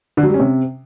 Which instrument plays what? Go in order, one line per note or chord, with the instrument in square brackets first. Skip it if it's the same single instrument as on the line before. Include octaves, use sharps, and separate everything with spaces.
[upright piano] D3
F#3
G3
C#4
C3